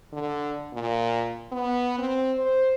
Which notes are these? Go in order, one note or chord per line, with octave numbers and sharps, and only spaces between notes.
D3
A#2
B3
C4
C5